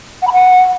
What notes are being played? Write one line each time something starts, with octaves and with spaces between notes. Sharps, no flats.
F#5
B5
F#5